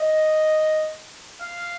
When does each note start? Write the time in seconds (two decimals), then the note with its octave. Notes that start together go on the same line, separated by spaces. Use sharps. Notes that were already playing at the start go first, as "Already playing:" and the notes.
Already playing: D#5
1.41 F5